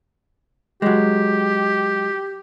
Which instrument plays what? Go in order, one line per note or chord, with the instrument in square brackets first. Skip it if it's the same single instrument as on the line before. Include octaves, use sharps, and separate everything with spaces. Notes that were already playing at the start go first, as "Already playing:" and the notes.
[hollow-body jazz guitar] F#3 G#3 [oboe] G4